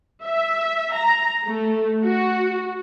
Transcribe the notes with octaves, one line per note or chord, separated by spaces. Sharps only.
E5
A#5
A3
F#4